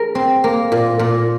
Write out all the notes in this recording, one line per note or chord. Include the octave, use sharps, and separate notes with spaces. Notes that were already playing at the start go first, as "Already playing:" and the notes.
Already playing: G#4 A#4
C4
A#3
A#2
A#2